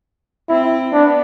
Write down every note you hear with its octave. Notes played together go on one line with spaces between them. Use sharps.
C4 E4
B3 D4